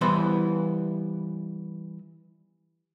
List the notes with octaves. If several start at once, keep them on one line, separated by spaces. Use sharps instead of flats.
E3 G3 B3 E4 C5